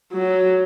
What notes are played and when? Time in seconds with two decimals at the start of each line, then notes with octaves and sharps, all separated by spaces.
0.12 F#3